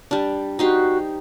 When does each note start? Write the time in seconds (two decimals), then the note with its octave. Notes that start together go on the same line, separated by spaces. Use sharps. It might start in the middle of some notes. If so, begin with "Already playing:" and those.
0.11 G3 D4
0.59 D#4 F#4 G4 C5